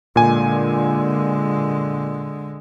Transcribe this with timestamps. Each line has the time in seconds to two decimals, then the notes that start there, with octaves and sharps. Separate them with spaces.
0.16 A#2 D3 G#3 G#5